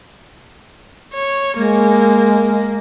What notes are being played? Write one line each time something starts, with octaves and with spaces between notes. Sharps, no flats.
C#5
G#3 A#3